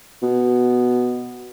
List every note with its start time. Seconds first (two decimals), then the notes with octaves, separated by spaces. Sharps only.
0.22 B2